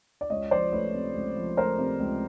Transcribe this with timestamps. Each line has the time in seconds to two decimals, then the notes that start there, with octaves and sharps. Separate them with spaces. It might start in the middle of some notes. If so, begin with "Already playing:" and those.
0.21 D5
0.30 C#2 C#5 D#5
0.51 F3 C5 D5
0.72 A3 B4 C#5
0.94 C3
1.15 C#2
1.36 F3
1.57 A3 A#4 C5
1.78 C3
2.00 C#2